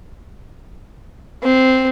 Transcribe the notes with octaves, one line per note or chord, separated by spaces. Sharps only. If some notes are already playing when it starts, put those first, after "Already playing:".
C4